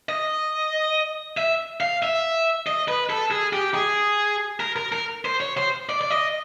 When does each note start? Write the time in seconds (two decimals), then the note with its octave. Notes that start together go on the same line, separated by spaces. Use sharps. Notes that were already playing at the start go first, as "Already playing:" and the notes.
0.09 D#5
1.37 E5
1.81 F5
2.03 E5
2.67 D#5
2.88 B4
3.10 A4
3.31 G#4
3.53 G4
3.74 G#4
4.60 A#4
4.76 A#4
4.92 A#4
5.25 C5
5.40 C#5
5.57 C5
5.89 D5
6.01 D5
6.10 D#5